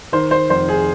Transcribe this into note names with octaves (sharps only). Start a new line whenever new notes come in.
D#3 C5
C5
F1 C5
G#4